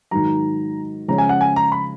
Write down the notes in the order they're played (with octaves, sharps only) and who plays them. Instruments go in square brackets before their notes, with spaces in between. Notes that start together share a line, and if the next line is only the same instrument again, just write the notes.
[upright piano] G#2 D#3 F#3 [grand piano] A#5
[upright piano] C#3 F3 G#3 C#4 [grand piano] A#5
[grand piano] G#5
F#5
G#5
A#5
B5